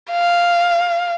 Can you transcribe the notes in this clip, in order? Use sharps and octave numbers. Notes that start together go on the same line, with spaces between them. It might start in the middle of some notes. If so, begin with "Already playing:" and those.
F5